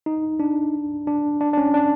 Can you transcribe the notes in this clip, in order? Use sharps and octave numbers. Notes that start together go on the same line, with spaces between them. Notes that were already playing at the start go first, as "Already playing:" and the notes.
D#4
D4
D4
D4
D4
C#4
D4